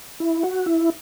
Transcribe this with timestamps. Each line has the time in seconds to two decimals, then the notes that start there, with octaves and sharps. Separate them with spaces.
0.20 E4
0.43 F#4
0.66 E4